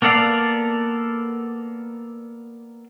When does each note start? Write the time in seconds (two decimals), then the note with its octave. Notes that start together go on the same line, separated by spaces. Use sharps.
0.02 A#3 B3 A4 D5 F5